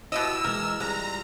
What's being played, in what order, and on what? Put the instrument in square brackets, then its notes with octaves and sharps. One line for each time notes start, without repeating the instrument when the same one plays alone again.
[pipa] B2 G4 D#5 [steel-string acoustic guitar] E4 [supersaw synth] E6
[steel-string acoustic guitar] E3 G#3 [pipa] A#4
[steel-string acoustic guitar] G3 F4 [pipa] G#3 [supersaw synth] A#5